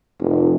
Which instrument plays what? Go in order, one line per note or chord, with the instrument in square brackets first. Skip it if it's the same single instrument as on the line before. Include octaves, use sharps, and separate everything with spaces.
[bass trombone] F1